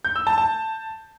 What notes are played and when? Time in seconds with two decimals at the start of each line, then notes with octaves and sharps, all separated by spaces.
0.05 G6
0.16 E6
0.27 A5
0.38 A5